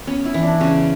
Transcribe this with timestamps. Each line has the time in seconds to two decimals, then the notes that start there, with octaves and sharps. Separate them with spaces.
0.07 B3 C#4
0.25 E4
0.34 E3
0.43 D4
0.60 C#3 C#4